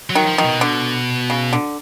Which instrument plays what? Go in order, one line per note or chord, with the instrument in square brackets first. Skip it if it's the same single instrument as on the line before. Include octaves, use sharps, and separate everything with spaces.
[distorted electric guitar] F#3
[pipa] D#3
[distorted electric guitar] F3
[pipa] D#3
[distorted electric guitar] B2
[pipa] D3
C#3
D3